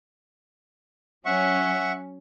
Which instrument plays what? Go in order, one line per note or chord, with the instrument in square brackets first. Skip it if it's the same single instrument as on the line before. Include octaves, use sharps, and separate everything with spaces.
[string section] F#3 C#4 [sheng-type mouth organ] E5 F#5 C#6